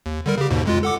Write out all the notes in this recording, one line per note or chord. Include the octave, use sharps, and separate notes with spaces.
D#2
D3 G3 A#4
C#3 G4
D#2 G#2 B2
F2 G#3 F4
A4 F#5 D6